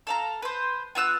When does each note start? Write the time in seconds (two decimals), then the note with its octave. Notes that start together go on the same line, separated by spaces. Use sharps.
0.07 A4 F5 A#5
0.42 B4 C5
0.95 B3 F4 E6 F#6